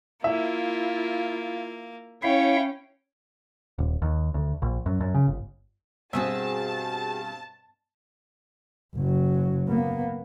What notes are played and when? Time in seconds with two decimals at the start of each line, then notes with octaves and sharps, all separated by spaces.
0.24 A#3 E4 F4 E5
2.23 C#4 E4 C#5 E5 F5 G5
3.78 D#1
4.02 D#2
4.34 D2
4.62 A#1
4.86 F#2
5.00 F#2
5.14 C#3
5.28 G1
6.13 G2 B2 C4 F#4 G#4 E5 A5
8.95 F#1 F#3
9.68 A#3 B3